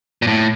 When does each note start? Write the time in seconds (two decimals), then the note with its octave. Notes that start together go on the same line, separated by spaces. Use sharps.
0.22 A#2
0.27 A2